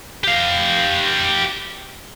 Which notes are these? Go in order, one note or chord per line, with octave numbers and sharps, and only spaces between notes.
G4 F5